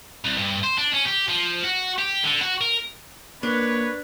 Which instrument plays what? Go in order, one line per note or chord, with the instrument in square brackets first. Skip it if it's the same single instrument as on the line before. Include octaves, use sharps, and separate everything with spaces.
[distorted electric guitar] C2
G2
C5
D4
C#4
G4
F3
F#4
G4
D3
F#4
A#4
[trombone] A#3 [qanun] D4 [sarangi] B4 [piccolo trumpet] C#5